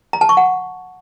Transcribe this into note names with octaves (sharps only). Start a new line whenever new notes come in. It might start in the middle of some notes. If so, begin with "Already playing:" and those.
A#5
A5
C#6
F#5